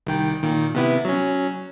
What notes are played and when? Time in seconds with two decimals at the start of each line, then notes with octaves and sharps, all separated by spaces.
0.07 C2 D#3 G5
0.43 A#2 D#3
0.75 C3 B3 E4
1.05 F#3 C#4